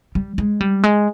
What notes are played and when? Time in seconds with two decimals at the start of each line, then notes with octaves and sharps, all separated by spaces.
0.15 G3
0.38 G#3
0.60 G3
0.83 G#3